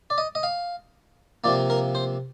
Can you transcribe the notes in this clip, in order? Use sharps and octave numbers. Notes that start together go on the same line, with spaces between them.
D5
D#5
D#5
F5
C3 F3 A#3 D5
A#4
C5